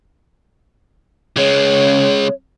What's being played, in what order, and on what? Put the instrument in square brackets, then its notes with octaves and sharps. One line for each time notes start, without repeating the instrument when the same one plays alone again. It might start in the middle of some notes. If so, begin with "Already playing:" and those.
[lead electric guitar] C#3 G#3 [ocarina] C#5